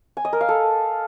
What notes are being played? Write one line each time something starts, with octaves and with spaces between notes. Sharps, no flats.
G#5
D#5
A#4
F5
A4